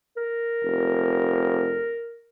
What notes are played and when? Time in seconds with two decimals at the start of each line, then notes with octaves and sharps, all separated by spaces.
0.17 A#4
0.64 F1